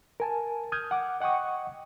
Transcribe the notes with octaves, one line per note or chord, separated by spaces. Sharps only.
A#4 G#5 A5
D#6 F6 G6 G#6
F#5 D6
D#5 F#5 G5 C#6 D#6